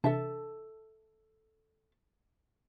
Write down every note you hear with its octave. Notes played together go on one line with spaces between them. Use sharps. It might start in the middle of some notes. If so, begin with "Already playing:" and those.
C3 E3 D4 A4 E5 A5